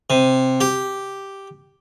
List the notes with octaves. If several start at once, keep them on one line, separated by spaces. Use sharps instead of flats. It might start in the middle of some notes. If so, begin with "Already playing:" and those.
C3
G4